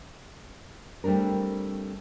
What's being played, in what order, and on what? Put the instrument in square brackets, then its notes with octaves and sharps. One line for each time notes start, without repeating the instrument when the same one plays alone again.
[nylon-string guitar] G3 A3 C4 D4 A#4